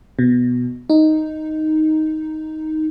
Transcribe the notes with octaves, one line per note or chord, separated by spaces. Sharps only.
B2
D#4